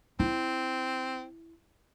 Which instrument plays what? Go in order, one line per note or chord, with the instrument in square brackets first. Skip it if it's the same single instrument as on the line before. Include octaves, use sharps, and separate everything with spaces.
[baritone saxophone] C4 [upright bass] E4